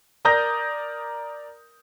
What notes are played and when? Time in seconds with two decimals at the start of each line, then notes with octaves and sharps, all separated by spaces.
0.25 A#4 D5 A#5 D#6 G6 A#6